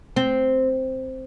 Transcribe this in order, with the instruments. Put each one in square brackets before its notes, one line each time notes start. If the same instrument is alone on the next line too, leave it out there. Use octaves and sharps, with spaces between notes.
[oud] C4